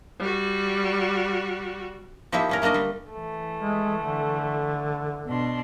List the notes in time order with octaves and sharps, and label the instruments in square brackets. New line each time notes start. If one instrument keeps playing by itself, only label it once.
[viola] G3 F#4
[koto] F3 A#3 D#4 E4 G4 E5
G3 C#4 A#4
A3 A#3 D4 A#4 D#5
D3 G3
[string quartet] E3 A3
[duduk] G#3
D3
[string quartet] B2 D4 C6